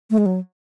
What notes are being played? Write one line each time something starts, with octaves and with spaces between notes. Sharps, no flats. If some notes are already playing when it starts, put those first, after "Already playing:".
A3
G#3
F#3